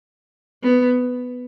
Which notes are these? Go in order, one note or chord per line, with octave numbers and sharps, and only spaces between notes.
B3